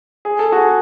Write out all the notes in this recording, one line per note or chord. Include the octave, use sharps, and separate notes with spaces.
G#4
A4
F#4 G#4